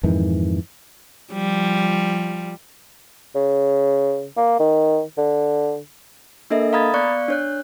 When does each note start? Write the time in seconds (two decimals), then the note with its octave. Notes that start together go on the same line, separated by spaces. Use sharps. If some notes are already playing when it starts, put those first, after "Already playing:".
0.03 F2 G#2 D#3 E3
1.33 F3 G3
3.35 C#3
4.37 A#3
4.60 D#3
5.18 D3
6.50 A#3 D4 A4 A#4 D#5 E5
6.73 F5 A#5 B5 D#6 G#6 A6
6.94 B3 D5 F5 C#6 F#6 C#7
7.28 D4 C#5 F#6